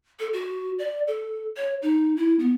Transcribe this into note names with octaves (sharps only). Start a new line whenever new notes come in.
A4
F#4
D5
A4
C#5
D#4
E4
B3